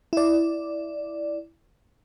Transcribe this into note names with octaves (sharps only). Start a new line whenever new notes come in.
E4 D5